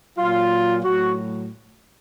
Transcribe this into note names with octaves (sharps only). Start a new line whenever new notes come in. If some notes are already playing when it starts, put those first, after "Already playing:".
A#2 F#3 F4
A2 F#3 F#4